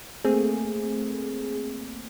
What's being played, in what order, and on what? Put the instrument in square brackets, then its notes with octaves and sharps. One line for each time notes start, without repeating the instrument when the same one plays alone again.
[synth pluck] A3 A#3 C4 G#4